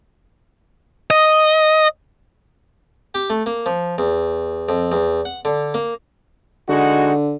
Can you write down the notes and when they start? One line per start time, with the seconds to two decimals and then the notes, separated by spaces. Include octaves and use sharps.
1.10 D#5
3.14 G4
3.30 A3
3.46 A#3
3.66 F3
3.98 E2
4.69 F2
4.92 E2
5.25 F#5
5.45 D3
5.74 A#3
6.69 D3 G#3 D#4 F#4